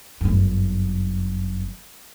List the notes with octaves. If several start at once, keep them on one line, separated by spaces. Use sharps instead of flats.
G1 F#2